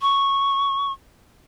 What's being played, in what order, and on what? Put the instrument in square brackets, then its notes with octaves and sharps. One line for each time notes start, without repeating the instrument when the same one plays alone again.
[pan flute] C#6